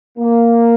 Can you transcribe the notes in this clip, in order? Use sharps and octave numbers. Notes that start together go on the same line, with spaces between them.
A#3